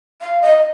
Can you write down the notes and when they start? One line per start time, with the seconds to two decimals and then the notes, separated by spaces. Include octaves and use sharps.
0.21 F5
0.42 D#5